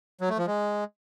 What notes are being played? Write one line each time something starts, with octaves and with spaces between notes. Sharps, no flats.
F#3
A3
F3
G#3